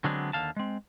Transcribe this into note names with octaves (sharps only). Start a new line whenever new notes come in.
D3 F#3 G#3 B3 C4 D4
D#2 D3 F5 A5
G#3 C4